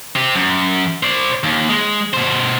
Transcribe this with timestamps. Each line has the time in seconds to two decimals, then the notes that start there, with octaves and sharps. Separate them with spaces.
0.16 C4 G4
0.36 F#2
1.03 C5 D5
1.43 D#2
1.69 G#3
2.14 B2 C5